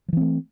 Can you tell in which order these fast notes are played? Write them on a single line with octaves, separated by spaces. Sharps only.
F3 E3 C4 A3